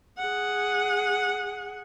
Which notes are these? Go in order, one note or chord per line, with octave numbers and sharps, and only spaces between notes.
G#4 F#5